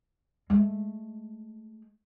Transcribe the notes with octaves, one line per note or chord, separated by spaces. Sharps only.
G#3 A3